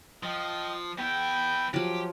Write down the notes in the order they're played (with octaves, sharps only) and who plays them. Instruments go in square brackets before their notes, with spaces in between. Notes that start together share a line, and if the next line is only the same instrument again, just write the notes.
[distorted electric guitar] F3 [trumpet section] D#5 G5
[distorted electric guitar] B3 E4 [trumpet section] G5
[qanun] F3 F#3 [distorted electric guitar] G4